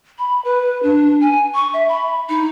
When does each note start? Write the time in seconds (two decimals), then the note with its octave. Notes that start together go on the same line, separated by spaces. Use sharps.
0.19 B5
0.45 B4
0.83 D4
1.21 G#5
1.55 C#6
1.74 E5
1.89 B5
2.29 D#4